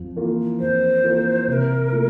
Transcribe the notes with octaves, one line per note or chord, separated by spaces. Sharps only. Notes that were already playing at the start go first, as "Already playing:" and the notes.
Already playing: F2
E3 A#3 F4
F2 C5
E3 A#3 F4
C3 A#4 C5
F3 A3